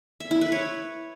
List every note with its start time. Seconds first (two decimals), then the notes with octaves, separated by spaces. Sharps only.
0.20 E5
0.31 E4
0.41 B4
0.52 C#5